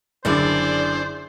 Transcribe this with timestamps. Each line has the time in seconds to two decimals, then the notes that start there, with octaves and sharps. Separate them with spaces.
0.25 F#1 D3 D4 E4 G#4 C5 D5